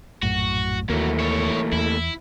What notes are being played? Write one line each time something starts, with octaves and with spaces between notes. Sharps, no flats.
A#1 F#2 A2 F#4
D#2 E3 F#3 A3 A#3
C#5 E5
E2 E4